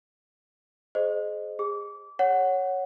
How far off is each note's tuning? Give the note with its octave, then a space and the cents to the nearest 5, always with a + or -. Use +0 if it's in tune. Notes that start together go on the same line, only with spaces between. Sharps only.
G#4 +25 C5 +0 D#5 -15
G#4 -25 D6 -25
C#5 +0 F#5 +0